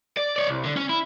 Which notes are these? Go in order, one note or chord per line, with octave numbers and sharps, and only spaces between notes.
D5
C#5 D5
C2
D3
C#4
E4